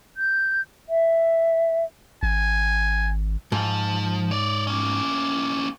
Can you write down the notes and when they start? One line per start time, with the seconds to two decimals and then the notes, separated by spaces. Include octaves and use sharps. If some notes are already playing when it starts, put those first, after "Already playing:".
0.17 G6
0.89 E5
2.23 G#1 G#5
3.52 G#2 F3
4.31 C#5 D5
4.67 A#3 C#4